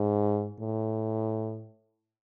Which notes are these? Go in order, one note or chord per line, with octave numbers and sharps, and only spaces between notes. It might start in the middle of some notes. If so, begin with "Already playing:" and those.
Already playing: G#2
A2